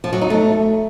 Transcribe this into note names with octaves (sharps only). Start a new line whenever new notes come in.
F3
F#3
D#4
A3